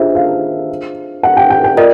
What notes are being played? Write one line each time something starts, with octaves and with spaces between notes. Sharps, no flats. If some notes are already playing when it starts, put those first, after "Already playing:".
Already playing: D4 F4 G#4 C5 D#5 E5
F5
F#5
G5
G5
G5
F4 A#4 D5 D#5